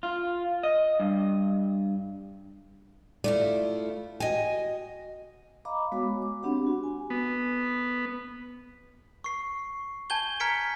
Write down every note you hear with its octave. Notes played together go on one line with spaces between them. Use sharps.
F4
D#5
G2
A3 E4 F4 D5
F#4 D#5 G5 G#5
D#5 F5 A#5 B5 D6
G#3 B3 F#4 C#5 B5 D6
D6
C4 D4 G4 F#5 B5
F#4
G#5
B3
C#6 C7
G#5 A5 G6 G#6 G7
A#5 F6 G#6 B6 C#7 D7